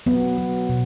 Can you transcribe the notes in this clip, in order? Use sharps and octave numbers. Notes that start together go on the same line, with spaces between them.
F#3 B3
F#3
B2